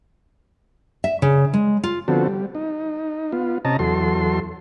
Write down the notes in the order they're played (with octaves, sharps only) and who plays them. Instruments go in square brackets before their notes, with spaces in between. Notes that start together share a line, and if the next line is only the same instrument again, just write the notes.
[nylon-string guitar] E5
C#3
G#3
F4
[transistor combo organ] D3 F3 B3 C4 F#4 A4
G3
D#4
B3 F4
C3 C#4 D#5 A5 A#5
E2 F#3 A4 C6